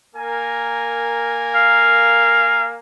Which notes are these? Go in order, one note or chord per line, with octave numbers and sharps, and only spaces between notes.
A#3 A#4 G#5
F5